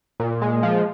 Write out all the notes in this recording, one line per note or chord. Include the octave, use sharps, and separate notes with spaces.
A#2
G#3
F3